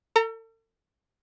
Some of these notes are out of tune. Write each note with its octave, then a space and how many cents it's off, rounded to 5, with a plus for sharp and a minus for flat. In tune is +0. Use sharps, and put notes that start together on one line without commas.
A4 +40 A#5 -15